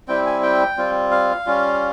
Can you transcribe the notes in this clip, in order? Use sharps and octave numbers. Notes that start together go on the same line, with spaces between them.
G3 C4 E4 G5
G#5
G5
G3 C4 F4
F5
G3 C#4 F4